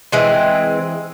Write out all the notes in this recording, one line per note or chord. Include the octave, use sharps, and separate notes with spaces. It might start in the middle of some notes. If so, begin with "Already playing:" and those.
E3 G#3 C4